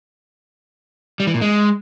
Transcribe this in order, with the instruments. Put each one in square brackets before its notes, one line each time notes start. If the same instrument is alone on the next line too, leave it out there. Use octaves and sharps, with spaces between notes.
[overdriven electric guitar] G3
E3
A#2
G#3